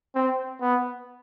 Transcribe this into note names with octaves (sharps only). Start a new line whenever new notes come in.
C4
B3